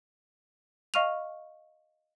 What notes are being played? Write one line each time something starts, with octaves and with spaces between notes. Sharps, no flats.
D#5 F5 C#6 F6 D#7 F7